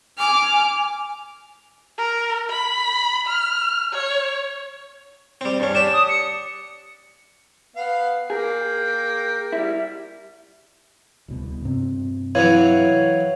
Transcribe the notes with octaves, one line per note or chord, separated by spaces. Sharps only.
G#5 D6 F6
A#4
B5
F6
C#5
G3 C4
G2 C#4
D4 G4 E7
D#6
C#7
B3 F5
A#3 G#4 A#4 G5
G3 E4
D1 C2 B2
G2 C3 C4
E3 F#3 C#5 F5